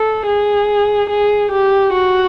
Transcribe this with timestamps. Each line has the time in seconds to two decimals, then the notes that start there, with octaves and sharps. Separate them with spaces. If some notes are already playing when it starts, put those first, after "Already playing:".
Already playing: A4
0.27 G#4
1.10 G#4
1.52 G4
1.94 F#4